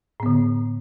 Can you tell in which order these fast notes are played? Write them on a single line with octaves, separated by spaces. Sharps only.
A2 B3 D3